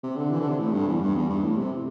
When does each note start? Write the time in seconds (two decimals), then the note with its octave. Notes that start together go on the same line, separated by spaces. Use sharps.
0.03 C3
0.17 D3
0.31 E3
0.40 D3
0.49 C3
0.59 A2
0.73 G2
0.87 E2
1.01 G2
1.16 E2
1.29 G2
1.44 A2
1.58 C3